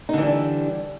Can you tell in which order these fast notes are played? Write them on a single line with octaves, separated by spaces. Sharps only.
D#4 D3 E3 G3 D4